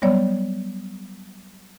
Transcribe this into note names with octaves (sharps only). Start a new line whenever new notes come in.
F#3 G3 B3 C#5 D5